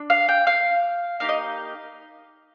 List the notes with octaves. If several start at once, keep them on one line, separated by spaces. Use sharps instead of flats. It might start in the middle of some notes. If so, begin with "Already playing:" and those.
Already playing: D4
F5
G5
F5
A#3 D#4 G4 F5
D#5